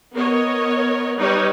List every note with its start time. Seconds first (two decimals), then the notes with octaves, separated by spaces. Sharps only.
0.14 B3 A#4 C#5 D#5
1.17 G3 D#4 B4 C#5